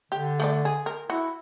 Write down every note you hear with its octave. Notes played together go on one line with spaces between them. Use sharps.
D3 G4
A3 A4 D5
G#4
A#4
E4 F#4